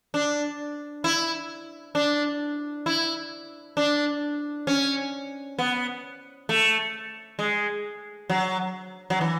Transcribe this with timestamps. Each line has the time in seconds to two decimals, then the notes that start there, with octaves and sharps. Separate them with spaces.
0.14 D4
1.04 E4
1.95 D4
2.86 E4
3.77 D4
4.67 C#4
5.59 B3
6.49 A3
7.39 G#3
8.30 F#3
9.10 F#3
9.21 E3